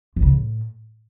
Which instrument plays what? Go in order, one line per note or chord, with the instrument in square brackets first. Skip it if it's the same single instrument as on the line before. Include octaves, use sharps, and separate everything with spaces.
[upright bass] F2
C#3
A2